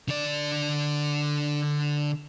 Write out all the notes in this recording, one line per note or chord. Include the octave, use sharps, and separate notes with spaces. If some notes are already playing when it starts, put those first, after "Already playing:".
D3 D5